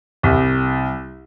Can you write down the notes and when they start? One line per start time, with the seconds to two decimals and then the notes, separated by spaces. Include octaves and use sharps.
0.23 C2